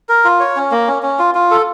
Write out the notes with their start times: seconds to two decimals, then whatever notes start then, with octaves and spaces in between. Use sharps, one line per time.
0.09 A#4
0.25 F4
0.40 C#5
0.56 C#4
0.71 A#3
0.87 C#4
1.03 C#4
1.19 F4
1.35 F4
1.51 A4